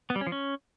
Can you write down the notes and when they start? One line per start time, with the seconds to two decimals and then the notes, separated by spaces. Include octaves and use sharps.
0.10 B3
0.16 G3
0.21 C#4
0.27 F3
0.32 C#4